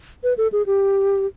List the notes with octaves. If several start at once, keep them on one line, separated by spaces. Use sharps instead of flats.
B4
A4
G#4
G4